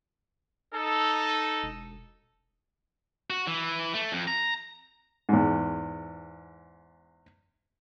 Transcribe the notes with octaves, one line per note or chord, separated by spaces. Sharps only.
D#4 A4
E1
F#4
E3
A3
F2
A#5
E2 G#2